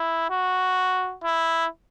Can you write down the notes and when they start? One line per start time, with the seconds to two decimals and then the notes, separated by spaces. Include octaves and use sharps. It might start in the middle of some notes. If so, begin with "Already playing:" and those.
Already playing: E4
0.30 F#4
1.24 E4